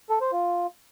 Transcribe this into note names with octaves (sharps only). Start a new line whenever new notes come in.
A4
C5
F4